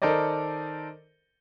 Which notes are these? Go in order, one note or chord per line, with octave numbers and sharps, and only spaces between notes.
D#3 A4 A#4 C5 D5 D#5